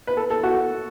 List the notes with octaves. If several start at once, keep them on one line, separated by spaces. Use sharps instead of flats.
B4
A4
A4
F#4